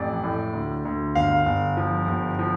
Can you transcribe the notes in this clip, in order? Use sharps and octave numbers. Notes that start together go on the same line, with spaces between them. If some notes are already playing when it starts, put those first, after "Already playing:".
Already playing: A1 F2 D5
A2
D2
D2
G1 F5
G1
F3
G1
F3